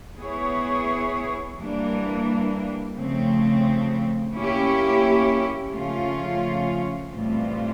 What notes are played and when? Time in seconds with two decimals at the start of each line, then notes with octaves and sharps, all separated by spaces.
0.19 B3 E4 G#4 C#5
1.57 E3 G3 A#3 D4
2.95 C#3 F3 A3 C4
4.34 A#3 C#4 E4 G4
5.72 C#3 F3 A3 C#4 F4
7.10 A2 E3 G3 C4 F4